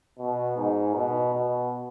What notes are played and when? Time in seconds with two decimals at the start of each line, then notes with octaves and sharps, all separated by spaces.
0.18 B2
0.57 G#2
0.95 B2
1.34 B2